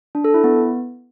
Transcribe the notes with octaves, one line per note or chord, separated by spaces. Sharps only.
D4
A4
E4
B3